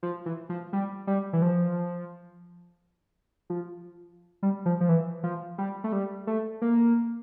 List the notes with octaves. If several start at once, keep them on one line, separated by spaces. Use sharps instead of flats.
F3
E3
F3
G3
G3
E3
F3
F3
G3
F3
F3
E3
F3
G3
A3
G3
A3
A#3